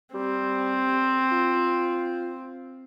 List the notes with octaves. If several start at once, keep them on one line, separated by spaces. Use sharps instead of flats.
G3 C4
F4